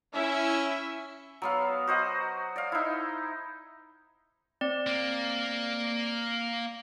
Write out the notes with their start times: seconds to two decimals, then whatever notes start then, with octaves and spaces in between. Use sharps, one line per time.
0.15 C#4 E4 E5
1.42 F#3 B3 F5
1.87 F#4 C5 D#5
2.56 D5 F5
2.72 D#4 E4
4.61 C4 D5
4.87 A#3